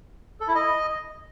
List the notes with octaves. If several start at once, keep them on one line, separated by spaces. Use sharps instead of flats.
A4
E4
D#5